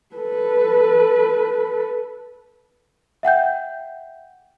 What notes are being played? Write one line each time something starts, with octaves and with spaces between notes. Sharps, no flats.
A4 B4
E5 F#5 G5 G6